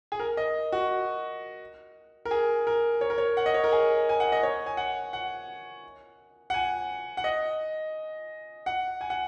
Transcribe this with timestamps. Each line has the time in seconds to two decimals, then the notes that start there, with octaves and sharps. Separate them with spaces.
0.12 G#4
0.20 A#4
0.37 D#5
0.72 F#4
2.25 A#4
2.31 G#4
2.67 A#4
3.01 C#5
3.10 A#4
3.18 C#5
3.37 F#5
3.46 D#5
3.54 C#5
3.64 A#4
3.72 G#4
4.09 G#5
4.20 F#5
4.32 D#5
4.43 C#5
4.66 G#5
4.77 F#5
5.13 F#5
6.50 F#5
6.54 G#5
7.17 F#5
7.24 D#5
8.66 F#5
9.01 G#5
9.10 F#5